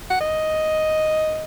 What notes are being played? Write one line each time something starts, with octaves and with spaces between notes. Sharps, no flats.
F#5
D#5